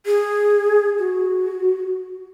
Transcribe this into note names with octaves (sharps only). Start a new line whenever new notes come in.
G#4
F#4